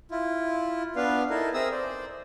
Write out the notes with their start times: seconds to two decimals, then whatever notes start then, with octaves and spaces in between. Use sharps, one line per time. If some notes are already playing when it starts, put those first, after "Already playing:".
0.11 E4 F4
0.96 B3 D4 B4 F5
1.30 D#4 E4 A4 A#4 E5
1.54 C4 G#4 A#4 E5 D#6 E6
1.72 C5 D5